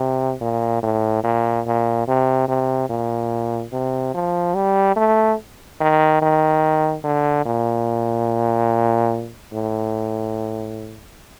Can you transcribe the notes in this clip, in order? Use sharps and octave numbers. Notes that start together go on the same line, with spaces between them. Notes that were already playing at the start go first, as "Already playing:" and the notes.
Already playing: C3
A#2
A2
A#2
A#2
C3
C3
A#2
C3
F3
G3
A3
D#3
D#3
D3
A#2
A2